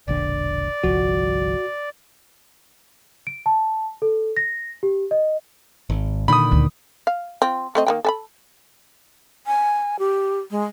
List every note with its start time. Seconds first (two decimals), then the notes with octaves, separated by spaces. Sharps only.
0.08 E1 A#1 D3 D5
0.84 G1 C2 F3 F#4
3.27 D7
3.46 A5
4.02 A4
4.37 A#6
4.83 G4
5.11 D#5
5.90 G#1
6.28 A#2 D3 D#3 B5 D#6
6.52 D2
7.07 F5
7.42 C4 F4
7.75 A3 C4 D#5
7.87 D#3 A#3 G5
8.05 A4 G#5 B5
9.47 G#5
9.99 G4
10.51 G#3